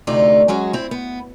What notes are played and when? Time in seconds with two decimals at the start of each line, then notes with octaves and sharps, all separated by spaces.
0.07 D2 C3 A3 D#4 F4 D5
0.48 F#3 G#3 C#4 F#4
0.73 C4 E4
0.91 B3